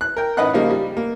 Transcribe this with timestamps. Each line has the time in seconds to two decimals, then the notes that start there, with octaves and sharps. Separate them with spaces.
0.01 F#6
0.17 A#4 G5
0.37 A1 D#4 B4 D#5 F#5 F#6
0.53 C#3 F3 G3 A#3 D#4
0.71 G3
0.97 A#3